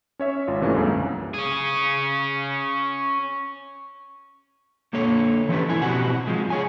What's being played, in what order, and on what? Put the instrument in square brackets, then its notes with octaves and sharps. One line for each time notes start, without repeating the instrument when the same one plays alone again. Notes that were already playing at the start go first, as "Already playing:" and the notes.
[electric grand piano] C#4 C#5 E5
G#1 F4
C3 E3 A3 A#3 C#4
C2 F#2 D3 G#3 A#3
[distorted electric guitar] C#4 G#4
[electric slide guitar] D3 A#3 A4 C#5
E3 F3 C#4 G4 A4 B4
D3 E4 G#5
B2 C4 F#4 G4 F#5
F3 G#3
G#4 C#5 G#5